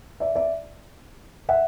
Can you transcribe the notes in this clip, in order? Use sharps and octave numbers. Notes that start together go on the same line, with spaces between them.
D5 E5
D5 E5
E5 F#5